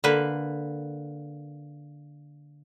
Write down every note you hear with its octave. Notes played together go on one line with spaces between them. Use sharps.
D3 A#3 B4